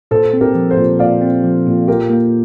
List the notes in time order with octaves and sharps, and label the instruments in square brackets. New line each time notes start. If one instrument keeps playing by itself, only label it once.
[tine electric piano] A#2 [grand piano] A4 C5
[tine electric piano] C4
[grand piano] G4 A#4
[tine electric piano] F3
[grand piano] A4 C5
[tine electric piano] A#2
[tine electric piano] A#2 [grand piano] D5 F5
[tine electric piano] C4
F3
A#2
[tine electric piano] F4 [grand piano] G4 A#4
[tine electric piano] A#3